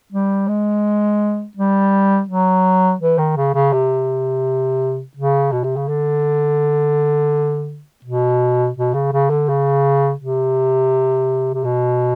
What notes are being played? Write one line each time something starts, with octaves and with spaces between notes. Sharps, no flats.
G3
G#3
G3
F#3
E3
D#3
C#3
C#3
C3
C#3
B2
C3
C#3
D3
B2
B2
C#3
C#3
D3
C#3
C3
C3
B2